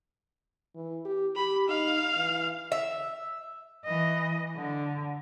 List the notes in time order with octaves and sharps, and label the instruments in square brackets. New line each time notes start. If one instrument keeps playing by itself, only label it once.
[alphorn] E3
G4
[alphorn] G4 [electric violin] B5
[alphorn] D#4 [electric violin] F5
[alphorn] E3
[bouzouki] E5
[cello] E3 D#5
D3